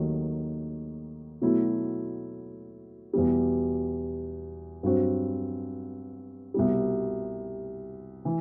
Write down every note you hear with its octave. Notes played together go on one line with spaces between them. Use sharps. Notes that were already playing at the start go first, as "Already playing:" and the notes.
Already playing: D#2 D#3 F#3 A3
B2 F#3 A3 E4
E2 B2 G3
G2 F#3 C4 F#4
C2 B2 G3
E3